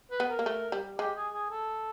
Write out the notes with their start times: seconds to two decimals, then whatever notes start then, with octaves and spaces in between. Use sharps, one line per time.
0.11 B4
0.20 B3
0.29 A#4
0.39 A#3
0.46 A3
0.72 G3
0.98 G#3 G4
1.16 G#4
1.34 G#4
1.51 A4